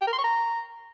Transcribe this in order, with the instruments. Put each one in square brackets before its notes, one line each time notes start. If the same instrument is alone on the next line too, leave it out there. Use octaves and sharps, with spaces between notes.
[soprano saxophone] G5
A#4
C6
C#6
A#5